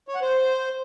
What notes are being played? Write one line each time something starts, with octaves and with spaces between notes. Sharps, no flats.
C#5
F#5
C5